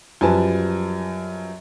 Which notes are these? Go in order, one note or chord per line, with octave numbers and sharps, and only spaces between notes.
F#2 F3 G3 B4 G#5 A5